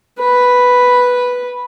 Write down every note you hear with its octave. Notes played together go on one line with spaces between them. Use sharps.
B4